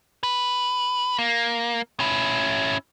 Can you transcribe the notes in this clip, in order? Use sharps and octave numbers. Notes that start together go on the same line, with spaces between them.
B4
A#3
C#4 E4